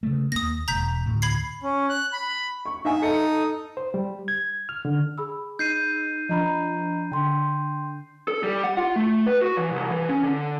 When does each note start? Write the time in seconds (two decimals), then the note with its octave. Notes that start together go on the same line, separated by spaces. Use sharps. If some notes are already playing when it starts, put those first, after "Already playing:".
0.03 C#3 A3
0.32 D#2 A#3 D#6 A#6
0.68 E1 A#5 G6 B6
1.06 D2 A2
1.22 B5 G#6 C7
1.63 C#4
1.89 F#6
2.13 B5
2.66 C#6
2.85 D#4 E5 F5 G#5
3.02 D#4 A4 D#6 C#7
3.77 C5
3.94 G3
4.28 G#6
4.69 F6
4.85 D3
5.18 G#4 B5 E6
5.59 D#4 G6 C7 D#7
6.29 F3 D4 D#5 A#5 B5
7.12 D3 G5 C6
8.28 A4
8.43 G3
8.64 F#5
8.77 F4
8.96 A3
9.26 B4
9.41 F#4
9.57 E3
9.71 C2
9.91 E3
10.09 C#4
10.23 D3